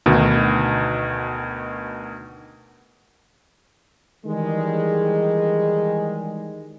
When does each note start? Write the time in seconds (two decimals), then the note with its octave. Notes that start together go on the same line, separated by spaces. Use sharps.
0.06 D2 B2 D#3
4.25 D#3 E3 G3 G#3